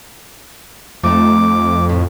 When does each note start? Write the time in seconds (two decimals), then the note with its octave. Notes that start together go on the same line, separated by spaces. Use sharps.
1.03 F2 A3 D#4 F4 D6
1.89 A2